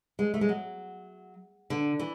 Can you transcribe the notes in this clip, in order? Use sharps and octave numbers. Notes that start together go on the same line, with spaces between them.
G#3
A3
G#3
F#3
D3
E3